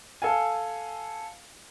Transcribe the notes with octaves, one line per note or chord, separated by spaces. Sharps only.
A4 F5 G#5